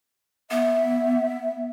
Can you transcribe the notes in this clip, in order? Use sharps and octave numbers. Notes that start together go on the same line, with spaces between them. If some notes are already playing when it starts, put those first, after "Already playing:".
B3 E5